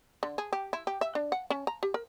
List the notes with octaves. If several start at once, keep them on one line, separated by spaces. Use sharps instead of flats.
D3
G#4
G4
E4
G4
E5
D4
F#5
C#4
A#5
G4
A#4